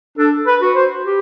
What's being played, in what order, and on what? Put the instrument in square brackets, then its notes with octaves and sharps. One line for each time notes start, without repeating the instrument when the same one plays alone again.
[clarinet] D4 [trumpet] A4
[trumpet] B4
[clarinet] F#4
[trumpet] C5
[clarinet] G4